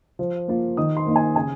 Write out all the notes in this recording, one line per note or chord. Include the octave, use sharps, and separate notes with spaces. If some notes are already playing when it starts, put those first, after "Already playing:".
F3
A#3 F4
D#3 D#6
C6
A#3 D#4
G#5
C#3 G#5